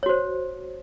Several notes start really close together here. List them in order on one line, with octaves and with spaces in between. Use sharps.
C#5 F#4 C5